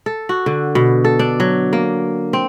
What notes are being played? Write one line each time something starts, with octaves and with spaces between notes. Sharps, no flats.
A4
F#4
D3
B2
A4
D4
F#3
A#3
C4